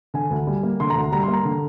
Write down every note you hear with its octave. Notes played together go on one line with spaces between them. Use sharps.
D3 G#5
D2
G3
A#3
D3 C6
A#5
D2
G3 A#5
C6
A#3
A#5
D3